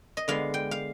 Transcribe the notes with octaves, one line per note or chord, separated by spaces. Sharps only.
D#5
D3 G#3 B3 F5
G5
F5